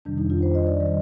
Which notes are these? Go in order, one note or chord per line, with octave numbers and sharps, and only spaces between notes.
F2 C3 D#3 G3 D4
D#4
F4
C5
D#5
D5
D#3 G3 D5
D#5